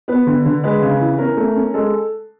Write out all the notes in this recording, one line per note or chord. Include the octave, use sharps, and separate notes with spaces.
B3 B4
D3
D3
G#3 B4
C#3
E3
C#4 A#4
A3
C#4
G#3 A4